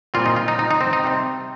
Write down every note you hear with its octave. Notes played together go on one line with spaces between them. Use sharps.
A#2 G3 C4 F4
D#4
F4
D#4
D#4
D#4
C4
D#4
C3 G3 C4